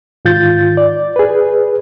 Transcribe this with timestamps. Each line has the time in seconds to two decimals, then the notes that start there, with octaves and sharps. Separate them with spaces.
0.25 G#2 D#3 F4 G6 A6
0.77 D5
1.16 G#4 B4